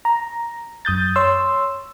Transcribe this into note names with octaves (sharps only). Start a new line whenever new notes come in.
A#5
F#2 D#6 G6 A6
C#5 C6 E6